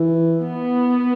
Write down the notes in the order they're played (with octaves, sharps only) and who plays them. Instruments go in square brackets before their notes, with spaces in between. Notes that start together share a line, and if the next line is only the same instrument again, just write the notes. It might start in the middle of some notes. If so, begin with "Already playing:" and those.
Already playing: [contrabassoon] E3
[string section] B3